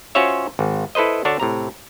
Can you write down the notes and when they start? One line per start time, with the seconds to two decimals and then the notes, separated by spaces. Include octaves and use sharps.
0.15 C#4 F4 F#4 C5 C#5 E5
0.59 G#1
0.95 E4 A4 B4 C5 D#5
1.25 D3 D4 F#4 C#5 A5
1.40 A2 C3 A#5